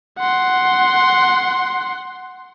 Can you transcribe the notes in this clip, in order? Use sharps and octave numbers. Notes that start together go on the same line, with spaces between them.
F#5 C6